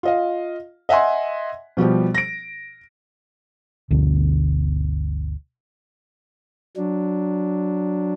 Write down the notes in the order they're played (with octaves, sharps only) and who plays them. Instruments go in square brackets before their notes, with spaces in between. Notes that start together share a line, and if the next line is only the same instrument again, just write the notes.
[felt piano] F4 D#5 F5
D#5 E5 F#5 G#5 C6
B2 F3 G3 G4
A#6 D7
[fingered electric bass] G1 D2 B2 D3
[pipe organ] F#3 D4